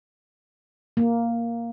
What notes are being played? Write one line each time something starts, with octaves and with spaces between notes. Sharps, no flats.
A#3